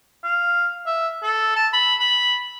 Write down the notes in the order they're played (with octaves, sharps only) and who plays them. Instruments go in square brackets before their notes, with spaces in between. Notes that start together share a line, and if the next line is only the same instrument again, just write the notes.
[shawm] F5
E5
A4
A5
B5
B5